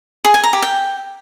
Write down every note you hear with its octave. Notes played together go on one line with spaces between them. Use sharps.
G#4
G#5
A#5
G4
G5